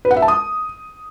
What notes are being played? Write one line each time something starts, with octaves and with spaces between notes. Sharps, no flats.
B4
F#5
E5
A5
D#6